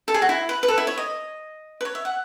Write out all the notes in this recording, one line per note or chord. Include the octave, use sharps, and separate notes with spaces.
A4
G#4
F#4
E4
B4
B4
A4
E4
C#5
D#5
B4
C#5
E5
F#5